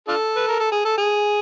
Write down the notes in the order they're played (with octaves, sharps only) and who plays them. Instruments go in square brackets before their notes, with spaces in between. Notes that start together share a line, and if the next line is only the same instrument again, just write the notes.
[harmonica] D4 F4 A4
B4
A#4
A4
G#4
A4
G#4